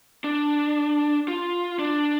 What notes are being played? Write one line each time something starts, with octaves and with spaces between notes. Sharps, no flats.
D4
F4
D4